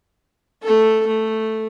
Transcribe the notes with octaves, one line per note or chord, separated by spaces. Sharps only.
A3 A4
A3